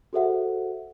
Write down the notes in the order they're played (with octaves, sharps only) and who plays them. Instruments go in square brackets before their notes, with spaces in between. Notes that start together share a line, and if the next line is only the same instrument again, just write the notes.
[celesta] F#4 G#4 A4 C5 E5 F#5